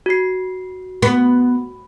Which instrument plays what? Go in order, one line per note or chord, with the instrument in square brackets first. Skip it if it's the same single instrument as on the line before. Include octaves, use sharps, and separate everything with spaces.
[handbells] F#4 C7
[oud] B3